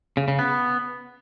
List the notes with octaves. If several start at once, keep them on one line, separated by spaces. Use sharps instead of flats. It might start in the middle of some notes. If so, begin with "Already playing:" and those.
C#3
C#3
B3